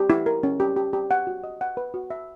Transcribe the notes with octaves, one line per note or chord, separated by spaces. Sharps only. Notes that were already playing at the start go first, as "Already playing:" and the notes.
Already playing: G4
E4
A#4
C#4
G4
G4
G4
F#5
F#4
D#5
F#5
B4
F#4
E5